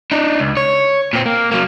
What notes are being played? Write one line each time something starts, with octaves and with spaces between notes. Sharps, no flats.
D4 D#4
C#2
C#5
A#2 C4
A#3
F#3 A#3